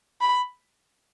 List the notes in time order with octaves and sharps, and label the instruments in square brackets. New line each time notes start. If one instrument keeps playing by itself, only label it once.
[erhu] B5